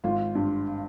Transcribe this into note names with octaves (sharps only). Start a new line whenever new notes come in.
G#1 F4 F5
G2